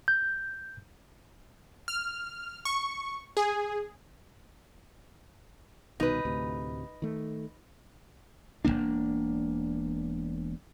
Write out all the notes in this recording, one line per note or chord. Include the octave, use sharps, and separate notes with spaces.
G6
F6
C#6
G#4
C2 B2 D#3 D#4 B4
D2 A2 C3
D#3 A3
E1 A2 A#3 D4